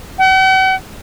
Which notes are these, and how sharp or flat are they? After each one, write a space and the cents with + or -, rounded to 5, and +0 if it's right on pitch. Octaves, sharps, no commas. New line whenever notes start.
F#5 +45